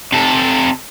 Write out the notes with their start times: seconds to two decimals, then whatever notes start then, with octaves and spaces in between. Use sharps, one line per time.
0.13 C3 A4